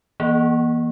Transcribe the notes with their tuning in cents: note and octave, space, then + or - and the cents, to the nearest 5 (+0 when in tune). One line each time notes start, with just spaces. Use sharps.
E3 +0 A#3 +40